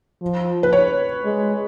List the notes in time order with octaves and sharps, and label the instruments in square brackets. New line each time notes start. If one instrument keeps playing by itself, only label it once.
[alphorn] F3
[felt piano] B4
C#5
[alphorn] G#3